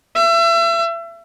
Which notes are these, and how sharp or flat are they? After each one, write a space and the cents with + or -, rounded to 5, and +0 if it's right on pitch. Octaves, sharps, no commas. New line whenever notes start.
E5 +35